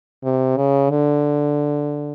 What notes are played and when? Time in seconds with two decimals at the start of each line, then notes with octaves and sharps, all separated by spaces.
0.24 C3
0.57 C#3
0.90 D3